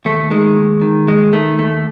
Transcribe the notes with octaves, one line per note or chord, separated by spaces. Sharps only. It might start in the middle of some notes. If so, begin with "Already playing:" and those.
D#2 A3
D#3 G#3
D#2
D#3
D#2 G#3
D#3 A3
D#2 A3